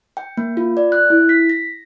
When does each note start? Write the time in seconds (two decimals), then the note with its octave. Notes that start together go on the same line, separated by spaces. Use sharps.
0.17 G5
0.37 A#3
0.57 F4
0.77 D5
0.92 F#6
1.10 E4
1.29 B6
1.50 A#6